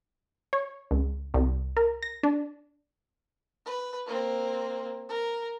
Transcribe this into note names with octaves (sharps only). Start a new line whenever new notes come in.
C#5
C#2
C2
A#4
A#6
D4
B4
A#3 C4
A#4